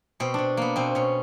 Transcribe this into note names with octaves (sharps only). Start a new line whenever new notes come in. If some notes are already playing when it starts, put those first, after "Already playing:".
B2 C4
B2 D4
A#3 B3
B2 C4
B2 C#4